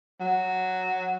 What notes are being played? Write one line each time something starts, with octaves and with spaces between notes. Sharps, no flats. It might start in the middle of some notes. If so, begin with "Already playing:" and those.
F#3